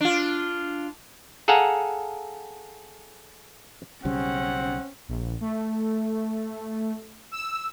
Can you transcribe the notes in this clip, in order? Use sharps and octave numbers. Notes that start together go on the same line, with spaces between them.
D4 F4
G#4 A4 F5 F#5 G#5 A#5
B1 C#3 G3 C4 C#4 F#5
A#1
A3
E6